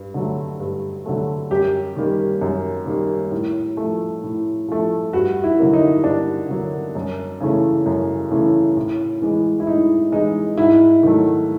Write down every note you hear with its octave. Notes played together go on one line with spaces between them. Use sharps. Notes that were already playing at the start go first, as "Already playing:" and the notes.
Already playing: G2
D3 F#3 A3
G2
D3 F#3 A3
F#2 G4
D#3 G3 A#3
F#2
D#3 G3 A#3
A2
F3 A3
A2
F3 A3
G2 F#4
E4
D3 F#3 A#3
D#4
G2 D4
D3 F#3 A#3
F#2
C#3 E3 A3
F#2
C#3 E3 A3
A2
E3 G#3
E4
A2 D#4
E3 G#3 D#4
G#2 E4
D#3 F#3 A3